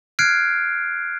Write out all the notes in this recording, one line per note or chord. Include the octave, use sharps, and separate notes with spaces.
F6 F#6 G#6 C7 D7